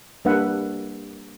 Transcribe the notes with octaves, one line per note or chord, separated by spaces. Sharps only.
G3 A#3 D4 B4 E5 F#5